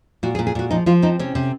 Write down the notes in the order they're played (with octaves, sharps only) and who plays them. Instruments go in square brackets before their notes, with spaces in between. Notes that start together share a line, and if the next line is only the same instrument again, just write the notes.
[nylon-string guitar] A#2 F#4
G#4
A#2
G#4
A#2 F#4
F3 D#4
F3 F4
C4 D#4
C3 C#4
C3